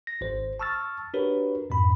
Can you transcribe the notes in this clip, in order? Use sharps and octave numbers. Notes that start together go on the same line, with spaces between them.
A#6
G#1 C5
A5 C#6 E6 F6 A6
D4 F#4 G4 A#4 B4 C#5
F2 G#2 B5